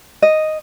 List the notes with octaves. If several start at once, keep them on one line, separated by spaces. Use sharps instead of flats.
D#5